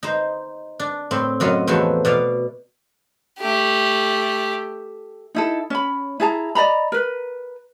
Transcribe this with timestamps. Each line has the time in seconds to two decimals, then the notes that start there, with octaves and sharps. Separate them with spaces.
0.03 D#4 C5
0.80 D4
1.11 A2 C4 C6
1.40 F#2 F#3 F4 D#5
1.67 E2 F3 F#3 A3 D#4 F#4
2.05 B2 D5 F5
3.39 A3 G4
5.35 D#4 E4 A4
5.70 C#4 B5
6.20 E4 G#4 A5 A#5
6.55 D5 D#5 A#5 B5
6.92 A#4 B4